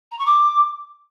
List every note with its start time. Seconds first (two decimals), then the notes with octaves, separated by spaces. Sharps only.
0.11 A#5
0.19 C#6
0.26 D6